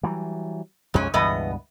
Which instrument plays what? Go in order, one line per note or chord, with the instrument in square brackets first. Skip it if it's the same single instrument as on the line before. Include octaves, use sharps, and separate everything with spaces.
[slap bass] E3 F#3 G3
[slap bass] B1 F2 G#3 [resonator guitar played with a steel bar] G#2 C#4
[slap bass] C#2 G2 B2 [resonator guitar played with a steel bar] E3 B3 D#5